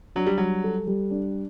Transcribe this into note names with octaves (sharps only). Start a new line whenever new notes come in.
F#3 D4
G3
F#3 G3
A4
G3
D4